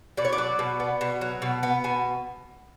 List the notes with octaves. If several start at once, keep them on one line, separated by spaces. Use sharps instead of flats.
B2 D5
C#5
D5
F#3
B2
B3
B2
F#3
B2
B3
B2 G#5